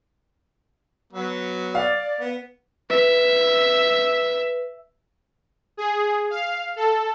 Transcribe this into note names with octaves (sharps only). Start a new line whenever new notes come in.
F#3 B3
D5 F5
B3
B4 E5
G#4
F5
A4